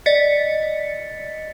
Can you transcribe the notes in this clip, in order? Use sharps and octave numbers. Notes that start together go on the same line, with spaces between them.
D5 D#5 A6 B6 C#7